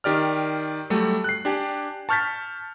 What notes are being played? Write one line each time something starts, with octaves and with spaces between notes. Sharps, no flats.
D#3 G4 D5 F6
F#3 G3 A3
F#6 C7
D4 G4 G#5
A5 C#6 F6 G6 A6 B6